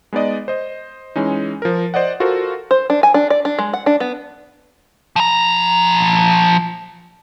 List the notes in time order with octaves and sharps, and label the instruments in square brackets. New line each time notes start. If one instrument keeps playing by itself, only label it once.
[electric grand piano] G#3 B3 D#4 D5 D#5
C5 D#5
E3 G#3 C#4 D#4
F3 A#4
C5 D5 D#5 F#5
F4 F#4 A4 A#4 C5 F#5
[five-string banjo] C5
D4
G#5
D4
D5
D4
G#3
F#5
D4
B3
[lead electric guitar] F3 A#5